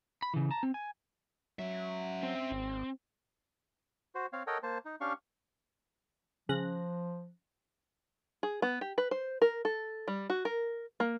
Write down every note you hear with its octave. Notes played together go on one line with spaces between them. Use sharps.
B5
C#3 E3
A5 A#5
C4
G#5
F#3 C#4 E5
C4
G#1
F#4 C5
C4 C#5 F5
A4 A#4 C#5 D#5 F#5 G5
A#3 C5 A5
D#4
C#4 D4 G4 F5 C#6
C#3 F3 F#6 A#6
G#4
B3
G4
B4
C5
A#4
A4
G3
F#4
A#4
A#3